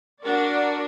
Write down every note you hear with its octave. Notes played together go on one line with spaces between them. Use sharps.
D4 F#4 A#4 D5